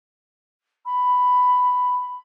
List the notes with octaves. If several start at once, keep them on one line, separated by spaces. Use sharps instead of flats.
B5